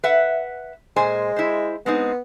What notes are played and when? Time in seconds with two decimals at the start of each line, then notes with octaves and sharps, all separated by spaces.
0.04 B4 E5 F#5
0.96 A#2 G#3 C5 G#5
1.36 E4 C5
1.86 G#3 B3 C4 D#4